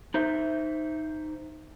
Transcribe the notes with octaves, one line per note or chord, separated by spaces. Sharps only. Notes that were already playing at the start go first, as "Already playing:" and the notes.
D#4 C5 E5